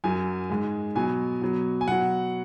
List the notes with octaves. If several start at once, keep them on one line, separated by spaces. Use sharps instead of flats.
F#2 F#3 G#5
G#2 G#3
B2 F#3 G#5
B2 F#3
G#5
B2 F#3 F#5